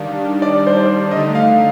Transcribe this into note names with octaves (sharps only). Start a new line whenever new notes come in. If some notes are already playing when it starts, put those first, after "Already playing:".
Already playing: D#3 G3 D4 F5
D5
C5
D5
D3 A3 D#4 D#5
F5